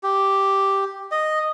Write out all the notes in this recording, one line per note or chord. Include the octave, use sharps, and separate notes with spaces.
G4
D#5